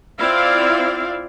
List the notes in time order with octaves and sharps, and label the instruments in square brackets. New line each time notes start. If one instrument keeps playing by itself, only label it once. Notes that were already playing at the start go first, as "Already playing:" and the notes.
[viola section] C4 E4 F4 D5 F5